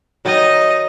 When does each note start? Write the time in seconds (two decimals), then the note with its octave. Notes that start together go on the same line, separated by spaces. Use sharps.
0.25 D#3 F#3 D#4 D#5